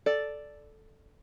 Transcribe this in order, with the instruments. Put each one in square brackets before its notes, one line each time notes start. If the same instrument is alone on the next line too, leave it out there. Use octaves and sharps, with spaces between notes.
[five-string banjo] A4 D5